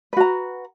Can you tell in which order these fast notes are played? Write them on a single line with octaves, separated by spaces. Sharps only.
B4 F#4 A#5